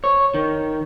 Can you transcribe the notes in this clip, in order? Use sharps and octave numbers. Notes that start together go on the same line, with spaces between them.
C#5
D#3